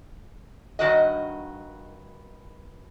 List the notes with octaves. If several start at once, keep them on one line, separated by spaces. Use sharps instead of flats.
G2 D#3 F#4 D#5